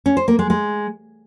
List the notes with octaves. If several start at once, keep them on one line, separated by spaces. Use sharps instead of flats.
C#4
C5
A#3
G#3
G#3